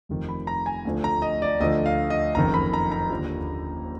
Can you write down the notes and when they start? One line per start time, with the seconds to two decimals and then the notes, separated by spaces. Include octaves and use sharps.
0.09 F1 F2 D#3
0.29 B5
0.47 A#5
0.66 G#5
0.85 D2 D3 F3
1.04 A#5
1.22 D#5
1.42 D5
1.60 D2 D3 F3 D#5
1.86 F5
2.10 D#5
2.35 F#1 F2 D#3 A#5
2.54 B5
2.73 A#5
2.92 A#5
3.10 D#2 D3 F3